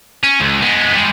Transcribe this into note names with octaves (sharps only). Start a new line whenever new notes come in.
C#4
C#2
G#3 B3
G3 G#3